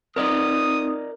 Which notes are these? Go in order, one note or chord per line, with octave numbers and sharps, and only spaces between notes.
C4 D#4 A#4 D5 D#5 D#6